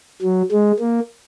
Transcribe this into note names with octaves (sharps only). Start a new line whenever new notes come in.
F#3
G#3
A#3